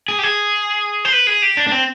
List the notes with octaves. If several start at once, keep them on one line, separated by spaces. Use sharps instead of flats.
G#4
G4
G#4
C5
B4
G#4
G4
D4
D4
C4